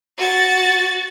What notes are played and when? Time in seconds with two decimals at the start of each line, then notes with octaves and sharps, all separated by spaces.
0.18 F#4 A6